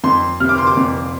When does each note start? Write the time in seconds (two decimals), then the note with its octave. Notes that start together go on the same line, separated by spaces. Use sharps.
0.04 F2 C6
0.40 C3 F6
0.49 D6
0.58 C6
0.67 D6
0.77 F2